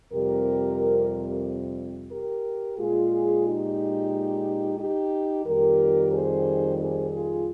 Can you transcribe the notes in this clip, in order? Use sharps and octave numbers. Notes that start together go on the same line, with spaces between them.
F2 C3 G3 G4 A#4
G4 A#4
A#2 G#3 F4 G#4
D#4 G4
D#4 G4
F2 D#3 G3 G4 A#4
G#4 C5
G#4 C5
F4 G#4